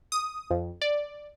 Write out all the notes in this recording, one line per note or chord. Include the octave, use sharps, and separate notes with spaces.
D#6
F2
D5